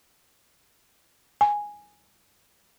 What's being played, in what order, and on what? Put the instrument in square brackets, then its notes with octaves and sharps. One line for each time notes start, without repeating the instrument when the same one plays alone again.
[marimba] G#5